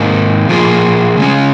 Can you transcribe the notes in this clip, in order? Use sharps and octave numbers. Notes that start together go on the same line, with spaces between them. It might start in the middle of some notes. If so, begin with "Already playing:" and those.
Already playing: G#2 D#3 A#3 D#4
A#2 F3 A#3 F4 G#4
C#3 G#3 C#4